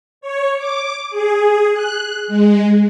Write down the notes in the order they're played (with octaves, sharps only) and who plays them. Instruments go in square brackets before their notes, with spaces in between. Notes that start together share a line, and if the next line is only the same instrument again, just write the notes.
[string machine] C#5
D6
G#4
F#6
G#3